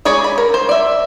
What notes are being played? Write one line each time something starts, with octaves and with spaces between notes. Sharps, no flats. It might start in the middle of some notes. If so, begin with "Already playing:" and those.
G#3 G#4 C#5 D5
B5
A#4
C5
D5 E5